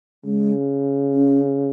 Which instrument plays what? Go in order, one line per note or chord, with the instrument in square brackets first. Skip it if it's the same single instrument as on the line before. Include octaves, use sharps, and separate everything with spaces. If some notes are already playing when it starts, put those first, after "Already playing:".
[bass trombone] C#3 [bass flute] G#3
[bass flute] C#4